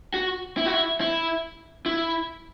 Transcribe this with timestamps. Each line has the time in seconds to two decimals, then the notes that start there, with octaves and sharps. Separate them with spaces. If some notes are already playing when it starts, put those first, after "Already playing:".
0.14 F#4
0.57 E4
0.66 F#4
0.74 E4
1.01 E4
1.86 E4